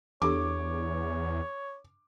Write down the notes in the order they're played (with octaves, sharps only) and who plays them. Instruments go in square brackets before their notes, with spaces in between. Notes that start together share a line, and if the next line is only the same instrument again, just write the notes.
[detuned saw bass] E2 [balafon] D4 G4 A4 [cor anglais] C#5 [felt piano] D6